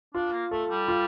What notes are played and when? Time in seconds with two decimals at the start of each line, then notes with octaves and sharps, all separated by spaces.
0.14 D4 F4
0.32 A#3
0.51 A3 A4
0.70 G3
0.88 F4